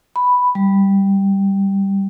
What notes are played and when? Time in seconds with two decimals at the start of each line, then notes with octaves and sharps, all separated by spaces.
0.16 B5
0.55 G3